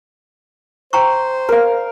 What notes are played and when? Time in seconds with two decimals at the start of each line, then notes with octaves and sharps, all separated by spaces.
0.93 C5 G5 A#5 C#6
1.49 A#4 F5